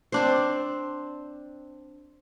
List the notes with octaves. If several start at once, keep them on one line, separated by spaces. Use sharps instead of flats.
C4 D4 C5